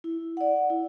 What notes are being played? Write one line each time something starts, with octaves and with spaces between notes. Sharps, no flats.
E4
D5 F#5
E4